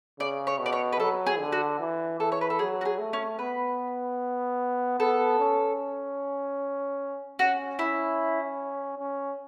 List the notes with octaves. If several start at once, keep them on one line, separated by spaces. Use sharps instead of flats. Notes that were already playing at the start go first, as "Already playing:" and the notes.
C#3 D5
C#5
B2
D5
C#5
B4
F#3 A4
G#4
D3
F#4
E3
E3 A4
C#5
B4
A4
F#3 G#4
F#4
G#4
A3
C#4
B3 B4
B3 A4
C#4
C#4 F#4
E4
C#4